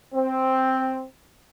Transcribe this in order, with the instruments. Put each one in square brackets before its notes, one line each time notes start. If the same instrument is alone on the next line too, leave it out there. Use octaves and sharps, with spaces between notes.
[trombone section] C4